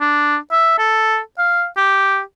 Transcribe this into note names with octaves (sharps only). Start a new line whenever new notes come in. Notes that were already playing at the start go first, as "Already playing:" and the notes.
D4
E5
A4
F5
G4